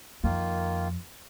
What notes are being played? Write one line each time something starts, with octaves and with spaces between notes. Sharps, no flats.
F2 D#3 A#3 F4